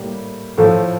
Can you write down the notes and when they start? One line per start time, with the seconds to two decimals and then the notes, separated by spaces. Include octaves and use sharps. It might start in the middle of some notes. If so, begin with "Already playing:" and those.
Already playing: A2 G3 A#3 G4
0.58 A2 F3 A3 A4